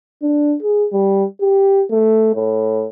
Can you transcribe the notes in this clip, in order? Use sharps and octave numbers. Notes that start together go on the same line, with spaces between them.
D4
G#4
G3
G4
A3
A2